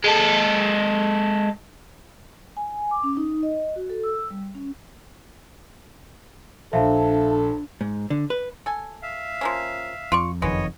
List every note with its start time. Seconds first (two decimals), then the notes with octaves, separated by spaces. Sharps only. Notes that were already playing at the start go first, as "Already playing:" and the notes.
0.04 G#3 A4
2.57 G#5
2.91 D6
3.04 C#4
3.17 D#4
3.43 D#5
3.76 F#4
3.90 A4
4.04 E6
4.30 G3
4.55 C#4
6.73 A#1 D4 A4 E5 F5 A5
7.81 G#2
8.10 D3
8.30 B4
8.66 A4 G#5
9.03 E5 F5
9.41 F3 A#3 C#4
10.12 F2 F4 D5 C#6
10.42 F#1 F2 D#3 G#3 B3 C#5 D#5